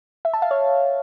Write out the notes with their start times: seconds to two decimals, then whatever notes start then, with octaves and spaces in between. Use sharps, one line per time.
0.25 E5
0.34 A5
0.42 F5
0.51 C#5